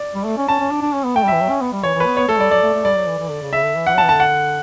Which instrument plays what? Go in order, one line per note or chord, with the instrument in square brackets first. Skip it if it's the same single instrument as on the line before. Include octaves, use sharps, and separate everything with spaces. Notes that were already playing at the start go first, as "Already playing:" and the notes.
Already playing: [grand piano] D5
[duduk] G3
A3
C#4
[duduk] C#4 [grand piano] A5
[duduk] C#4
D4
D4
C#4
B3
[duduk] A3 [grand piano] G5
[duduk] G3
[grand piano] E5
[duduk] E3
F#3
C#4
B3
G3
[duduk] E3 [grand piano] C#5
[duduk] E3
[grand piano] B4
[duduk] B3
[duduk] B3 [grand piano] C#5
[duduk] A3 [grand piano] A4
[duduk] G3 [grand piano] D5
[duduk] F#3 [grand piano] D5
[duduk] A3
A3
[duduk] G3 [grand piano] D5
[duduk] F#3
E3
E3
D3
C#3
[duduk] C#3 [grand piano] E5
[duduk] D3
E3
[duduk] E3 [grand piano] F#5
[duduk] F#3
[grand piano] A5
[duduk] E3
[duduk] D3 [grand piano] A5
[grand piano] F#5